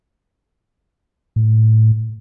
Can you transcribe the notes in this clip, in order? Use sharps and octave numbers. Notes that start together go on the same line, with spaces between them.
A2